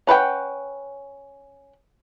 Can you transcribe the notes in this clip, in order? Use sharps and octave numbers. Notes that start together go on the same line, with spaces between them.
C#4 B4 F#5 G5